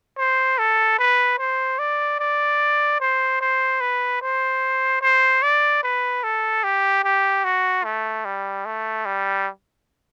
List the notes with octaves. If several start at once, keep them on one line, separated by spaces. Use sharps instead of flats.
C5
A4
B4
C5
D5
D5
C5
C5
B4
C5
C5
D5
B4
A4
G4
G4
F#4
A3
G3
A3
G3